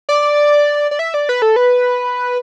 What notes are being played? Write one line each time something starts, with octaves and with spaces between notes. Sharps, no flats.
D5
D5
E5
D5
B4
A4
B4